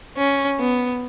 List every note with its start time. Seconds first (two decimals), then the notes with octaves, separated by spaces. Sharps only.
0.17 C#4
0.60 B3